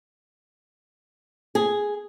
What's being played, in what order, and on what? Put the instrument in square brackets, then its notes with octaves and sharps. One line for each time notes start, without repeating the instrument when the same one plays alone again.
[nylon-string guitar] G#4